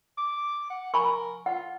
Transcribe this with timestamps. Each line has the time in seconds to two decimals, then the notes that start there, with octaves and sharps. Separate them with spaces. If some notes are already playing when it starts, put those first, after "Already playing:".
0.18 D6
0.70 F#5
0.94 A#4 G#5 B5 C#6
1.46 F4 F#5